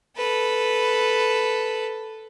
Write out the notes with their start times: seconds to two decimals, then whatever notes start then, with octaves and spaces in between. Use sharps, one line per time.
0.17 A4 B4